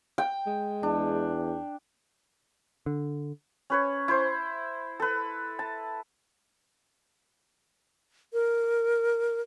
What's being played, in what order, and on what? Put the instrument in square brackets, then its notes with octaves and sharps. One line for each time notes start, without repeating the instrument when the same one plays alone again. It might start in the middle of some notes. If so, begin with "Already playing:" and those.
[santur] G5
[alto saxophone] G#3
[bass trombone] E2 [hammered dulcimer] D4
[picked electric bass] D3
[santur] C#4 B4 C#5
E4 C5
A4 B4
A5
[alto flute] A#4